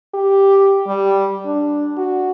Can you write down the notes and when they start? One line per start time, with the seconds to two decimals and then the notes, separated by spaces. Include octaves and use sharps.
0.14 G4
0.87 G3
1.46 D4
1.97 F#4